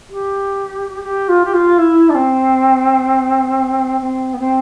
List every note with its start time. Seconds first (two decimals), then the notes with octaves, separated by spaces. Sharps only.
0.10 G4
1.03 G4
1.28 F4
1.44 G4
1.53 F4
1.78 E4
2.09 D4
2.14 C4
4.00 C4
4.33 B3
4.38 C4